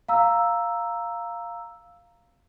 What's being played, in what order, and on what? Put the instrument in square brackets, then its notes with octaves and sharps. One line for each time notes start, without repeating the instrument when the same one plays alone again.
[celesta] F5 A#5 E6